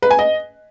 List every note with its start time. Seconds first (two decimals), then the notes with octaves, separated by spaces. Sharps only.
0.02 B4
0.11 G#5
0.19 D#5